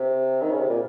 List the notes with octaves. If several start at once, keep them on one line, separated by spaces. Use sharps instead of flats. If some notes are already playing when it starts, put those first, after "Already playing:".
Already playing: C3
D#3
C#3
C3
A#2